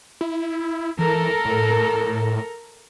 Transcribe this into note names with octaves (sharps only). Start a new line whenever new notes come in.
E4
E3 A4 A#4
A2